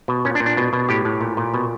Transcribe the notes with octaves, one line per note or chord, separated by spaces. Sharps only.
B2
A#2 C#4
D4
A#2
D4
B2
B2
A2 G4
A2
A#2
A#2
B2